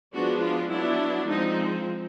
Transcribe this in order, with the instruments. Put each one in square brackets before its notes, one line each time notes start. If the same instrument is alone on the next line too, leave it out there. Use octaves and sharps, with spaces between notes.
[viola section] F3 G#3 B3 D4 F#4
F4
F#3 B3 D4 E4
F3 G#3 C4 D#4